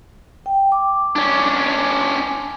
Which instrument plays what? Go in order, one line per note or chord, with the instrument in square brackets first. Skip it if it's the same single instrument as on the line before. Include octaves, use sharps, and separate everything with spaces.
[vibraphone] G5
D6
[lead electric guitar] C#4 D4